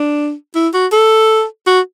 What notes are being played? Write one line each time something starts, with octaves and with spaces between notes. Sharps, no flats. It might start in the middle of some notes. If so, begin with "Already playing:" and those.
Already playing: D4
E4
F#4
A4
F#4